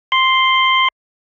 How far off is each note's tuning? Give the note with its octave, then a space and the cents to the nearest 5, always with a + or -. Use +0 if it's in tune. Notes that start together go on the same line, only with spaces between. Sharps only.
C6 +0